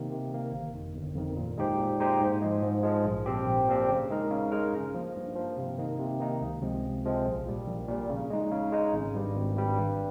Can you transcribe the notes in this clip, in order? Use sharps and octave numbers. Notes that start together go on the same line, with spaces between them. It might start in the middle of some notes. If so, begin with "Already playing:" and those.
Already playing: C3 D#3 A#3
C3
D#3 A#3
G1
F2 D#3
G1
F2 D#3
A#2
G#3 D#4 G4 C5
A#2
G#3 D#4 G4 C5
G#2
F3 G#3
G#2
F3 G#3
A#1
A#2 F3 C4 G4
A#1
A#2 F3 C4 G4
C#3
G#3 D#4 A#4
C#3
G#3 D#4 A#4
G2
F3 A#3
G2
F3 A#3
C3
D#3 A#3 D#4
C3
D#3 A#3 D#4
C#2
C3 F3 G#3 C4
C#2
C3 F3 G#3 C4
A#1
A#2 G3
A#1
A#2 G3
C#3
G#3 D#4
C#3
G#3 D#4
G#1
G2 G3
G#1
G2 G3
G2